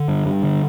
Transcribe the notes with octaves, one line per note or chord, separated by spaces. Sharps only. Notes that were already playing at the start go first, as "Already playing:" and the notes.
Already playing: D3
G2
G2
D3